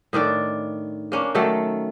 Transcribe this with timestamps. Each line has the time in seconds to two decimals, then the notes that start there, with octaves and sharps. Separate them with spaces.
0.13 A2 D#3 D4 D5
1.12 A#3 C#4 D4
1.35 D#3 F#3 A3 A4